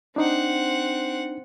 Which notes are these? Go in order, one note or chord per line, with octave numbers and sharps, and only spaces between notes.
C4 D4 D#4 F#5